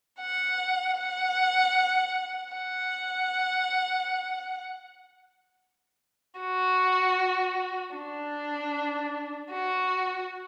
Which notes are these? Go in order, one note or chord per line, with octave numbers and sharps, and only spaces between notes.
F#5
F#5
F#5
F#4
D4
F#4